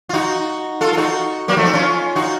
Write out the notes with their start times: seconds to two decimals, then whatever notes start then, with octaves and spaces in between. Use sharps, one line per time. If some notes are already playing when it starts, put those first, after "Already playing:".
0.09 F4
0.13 D#4 F#4
0.81 F4 A4
0.93 A4
0.97 D#4 F#4
1.48 F#3 A#3
1.57 F3 A3
1.65 C4 D#4
1.74 C#4 F4
2.16 D#4 F#4